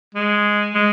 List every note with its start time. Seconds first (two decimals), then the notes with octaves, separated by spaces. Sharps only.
0.15 G#3
0.74 G#3